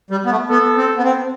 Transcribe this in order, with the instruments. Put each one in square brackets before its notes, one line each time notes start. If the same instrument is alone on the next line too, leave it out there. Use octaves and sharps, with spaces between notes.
[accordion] G3
B3
A3
[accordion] B3 [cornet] A4
[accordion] C4
B3
C4